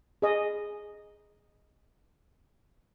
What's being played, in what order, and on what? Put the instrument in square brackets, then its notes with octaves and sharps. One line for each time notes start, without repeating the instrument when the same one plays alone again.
[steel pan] G#4 D#5